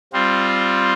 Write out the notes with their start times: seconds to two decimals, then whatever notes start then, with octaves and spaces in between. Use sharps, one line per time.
0.13 G3 C4 F4